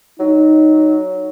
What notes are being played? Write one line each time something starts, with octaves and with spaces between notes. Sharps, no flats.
F#3 D#4